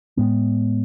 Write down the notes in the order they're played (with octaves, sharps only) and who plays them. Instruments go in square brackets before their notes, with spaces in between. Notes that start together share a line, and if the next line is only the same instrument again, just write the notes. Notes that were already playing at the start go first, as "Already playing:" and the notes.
[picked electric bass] A2 G#3 B3